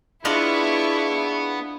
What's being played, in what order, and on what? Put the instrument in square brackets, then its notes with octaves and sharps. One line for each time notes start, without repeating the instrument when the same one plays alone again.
[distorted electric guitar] B3 [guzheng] D4 F4 D#5 [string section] E4 C#6 [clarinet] G#4